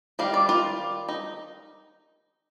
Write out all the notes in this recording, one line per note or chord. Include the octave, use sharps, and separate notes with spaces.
D#3 G3 F5
D5
F4
D#4